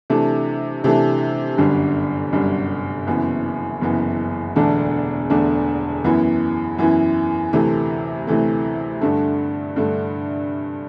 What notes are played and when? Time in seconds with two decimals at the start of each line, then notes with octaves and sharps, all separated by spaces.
0.10 C3 E3 A3 D4
0.84 C3 E3 A3 D4
1.58 G1 F#2 D3 G3
2.32 G1 F#2 D3 G3
3.07 F#1 F#2 E3 B3
3.81 F#1 F#2 E3 B3
4.56 E1 E2 D3 A3 D4
5.30 E1 E2 D3 A3 D4
6.04 F#2 E3 B3 E4
6.78 F#2 E3 B3 E4
7.53 D2 C3 E3 A3
8.27 D2 C3 E3 A3
9.01 G2 D3 A3
9.76 G2 D3 A3